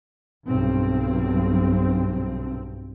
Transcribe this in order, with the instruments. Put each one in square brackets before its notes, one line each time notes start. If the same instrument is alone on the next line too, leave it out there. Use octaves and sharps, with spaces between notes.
[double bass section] B1 G2 C4